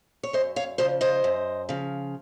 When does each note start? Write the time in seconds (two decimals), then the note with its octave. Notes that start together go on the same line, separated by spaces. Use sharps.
0.23 C#5
0.33 F#2 C5 D#5
0.56 C#5 F5
0.78 C#3 F3 C5 D#5
1.01 C5 D#5
1.24 F#2
1.69 C#3 F3